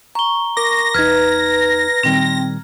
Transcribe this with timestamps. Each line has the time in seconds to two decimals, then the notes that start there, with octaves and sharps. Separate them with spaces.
0.15 A#5 C#6 G7
0.57 A#4 D6 A#6
0.94 E2 D#4 B4 A#5 F6 G#6
2.03 A#2 D#3 G3 C4 G5